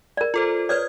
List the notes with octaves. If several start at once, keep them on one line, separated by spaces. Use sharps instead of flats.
A#4 D5
F4 A4 C5
B4 C#5 D5 D#6 F6 G#6